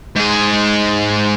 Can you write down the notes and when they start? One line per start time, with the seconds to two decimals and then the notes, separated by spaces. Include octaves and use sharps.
0.16 G#2 G#4